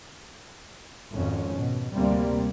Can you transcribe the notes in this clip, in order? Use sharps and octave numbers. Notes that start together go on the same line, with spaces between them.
G#1 F2 G#2 C#4
B2
D2 C3 G3 A#3 C4